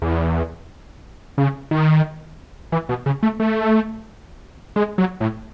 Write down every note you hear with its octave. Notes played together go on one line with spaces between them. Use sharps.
E2
C#3
D#3
E3
B2
C#3
A3
A3
G#3
F#3
A2